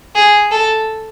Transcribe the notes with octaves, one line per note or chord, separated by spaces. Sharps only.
G#4
A4